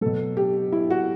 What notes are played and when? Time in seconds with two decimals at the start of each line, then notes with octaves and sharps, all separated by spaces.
0.01 B2 F#3 A4
0.37 G4
0.72 E4
0.90 F#4